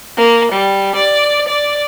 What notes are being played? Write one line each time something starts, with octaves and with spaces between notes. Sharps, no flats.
A#3
G3
D5
D5